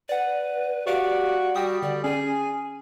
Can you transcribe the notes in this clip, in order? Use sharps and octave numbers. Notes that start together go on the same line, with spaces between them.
B4 D5 F#5
F#4 G4 D5 F5 D7
G3 F#4 G5 D#6
D3 D5
C#4 G#4 G#5